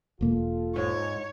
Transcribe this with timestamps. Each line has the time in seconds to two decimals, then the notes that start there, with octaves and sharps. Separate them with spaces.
0.21 E1 A#3 F4 A4
0.76 G#2 C#5